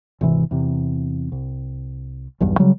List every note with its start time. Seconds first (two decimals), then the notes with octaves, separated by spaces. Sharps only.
0.21 G#1 C3 E3
0.51 E2 C3
1.32 C2
2.40 B1 E2 G2
2.59 C#3 F#3 G3